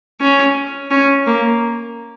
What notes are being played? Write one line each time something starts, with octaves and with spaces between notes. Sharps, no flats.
C#4
C#4
A#3